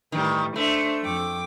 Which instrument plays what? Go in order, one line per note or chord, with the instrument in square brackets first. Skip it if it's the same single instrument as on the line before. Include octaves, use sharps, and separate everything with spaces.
[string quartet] A2 E3 G3 [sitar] D#3
[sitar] A3 [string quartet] D4 C5 E5
[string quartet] F2 G5 D6